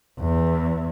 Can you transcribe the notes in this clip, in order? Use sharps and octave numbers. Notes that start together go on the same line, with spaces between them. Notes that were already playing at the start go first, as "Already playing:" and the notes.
E2